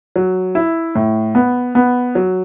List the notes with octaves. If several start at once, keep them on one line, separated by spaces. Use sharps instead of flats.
F#3
E4
A2
B3
B3
F#3